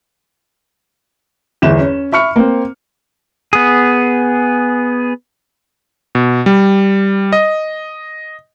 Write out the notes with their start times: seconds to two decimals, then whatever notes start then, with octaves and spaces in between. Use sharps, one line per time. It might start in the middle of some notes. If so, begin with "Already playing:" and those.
1.62 G1 E2 E7
1.79 C#4
2.12 E5 B5 C#6 F6 C#7
2.36 A#3 C4
3.53 B3 G#4
6.15 B2
6.46 G3
7.33 D#5